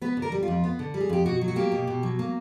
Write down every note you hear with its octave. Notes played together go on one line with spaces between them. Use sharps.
B3 B4
D3
A#4
G3
F4
F2
B3
D3
G3
G#4
F2 G4
B2 F#4
F#3
F#4
A#3 G4
B2
B2
F#3
A#3